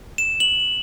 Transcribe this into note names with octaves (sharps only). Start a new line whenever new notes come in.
E7
F#7